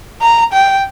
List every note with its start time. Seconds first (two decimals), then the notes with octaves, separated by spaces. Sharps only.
0.22 A#5
0.53 G5